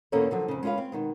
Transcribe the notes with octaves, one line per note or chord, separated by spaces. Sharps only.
E2 B2 A#3 C#4 A4 A#4
D3 F3 F#3
F2 C#3
G#3 C#4 F4 B4 F5
C4
B2 D#3 G#3